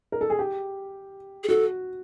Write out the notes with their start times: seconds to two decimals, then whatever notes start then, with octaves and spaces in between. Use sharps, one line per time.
0.12 A#4
0.21 A4
0.30 G#4
0.39 G4
1.44 G#4
1.48 F#4 A4